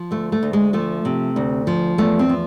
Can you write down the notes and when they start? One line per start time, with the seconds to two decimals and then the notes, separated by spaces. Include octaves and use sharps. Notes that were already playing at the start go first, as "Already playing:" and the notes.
Already playing: F3
0.11 D2 A3
0.32 A3
0.43 D2
0.53 G#3
0.73 F3 A3
1.05 C3
1.36 D2
1.67 F3
1.98 E2 A3
2.19 C4
2.29 F3